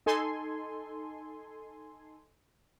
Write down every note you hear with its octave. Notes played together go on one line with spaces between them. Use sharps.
D#4 A4 G#5 C6